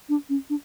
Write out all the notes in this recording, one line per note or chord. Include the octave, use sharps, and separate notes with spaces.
D4
C#4
D4